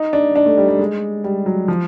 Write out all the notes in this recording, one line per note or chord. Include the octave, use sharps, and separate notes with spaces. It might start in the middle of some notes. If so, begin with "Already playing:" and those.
Already playing: D#4
D4
D4
A3
G3
G3
G#3
G3
F#3
F3